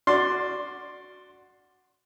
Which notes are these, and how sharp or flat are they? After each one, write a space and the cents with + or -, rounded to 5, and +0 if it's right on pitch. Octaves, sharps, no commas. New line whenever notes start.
F#4 +0 D5 +5 C6 +0